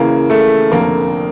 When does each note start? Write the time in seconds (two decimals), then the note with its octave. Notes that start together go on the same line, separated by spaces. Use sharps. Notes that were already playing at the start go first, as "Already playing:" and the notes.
Already playing: E2 C#3 E3 A#3
0.30 A3
0.71 F1 F2 D3 A#3